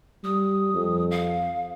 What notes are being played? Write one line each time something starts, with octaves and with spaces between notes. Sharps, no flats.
G3 D#6
F2
F5